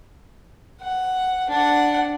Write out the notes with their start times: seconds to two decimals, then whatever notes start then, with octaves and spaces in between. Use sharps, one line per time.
0.81 F#5
1.49 D4 F#5